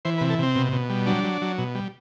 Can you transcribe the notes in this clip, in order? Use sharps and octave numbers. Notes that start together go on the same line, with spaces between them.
E3 C5
B4
C3
A4
C3 C4
B2
B2
G3
F#3 D4
F#3
F#3
B2
G3